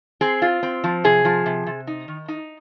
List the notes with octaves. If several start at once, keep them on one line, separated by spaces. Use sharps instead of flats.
C4 G#4
F4
C4
F3
C3 G#4
F3
C3
C3
D#4
D#3
D#4